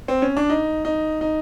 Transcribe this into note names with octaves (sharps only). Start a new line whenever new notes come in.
C4
C#4
D4
D#4
D#4
D#4